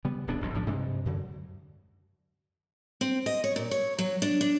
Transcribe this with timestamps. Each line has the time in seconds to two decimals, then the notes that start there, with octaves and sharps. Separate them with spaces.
0.04 C#3 G3 B3
0.27 D1 B1 B3 D4
0.41 E1 B1 G#2 F#3
0.54 B1 A2 F3 D4
0.66 G2 C3 G3 G#3
1.05 F#2 D3 F#3
3.01 C4
3.26 D#5
3.44 C#5
3.56 A#2
3.71 C#5
3.99 F#3
4.22 D4
4.41 D4